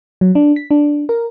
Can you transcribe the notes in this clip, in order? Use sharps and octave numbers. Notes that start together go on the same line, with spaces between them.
F#3
D4
B6
D4
A#4